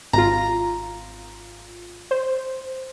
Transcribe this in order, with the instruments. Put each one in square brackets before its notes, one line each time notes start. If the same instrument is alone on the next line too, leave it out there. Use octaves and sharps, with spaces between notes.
[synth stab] G#1 F4 [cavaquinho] A#5
[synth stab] C5